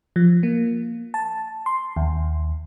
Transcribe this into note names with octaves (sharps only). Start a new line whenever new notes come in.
F3
A#3
A5
C6
D#2